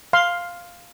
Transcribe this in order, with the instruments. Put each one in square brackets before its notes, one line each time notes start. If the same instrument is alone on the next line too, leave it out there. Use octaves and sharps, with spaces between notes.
[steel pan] F5 C6